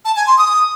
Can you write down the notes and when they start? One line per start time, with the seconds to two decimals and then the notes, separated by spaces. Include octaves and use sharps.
0.05 A5
0.16 G#5
0.27 C6
0.38 D#6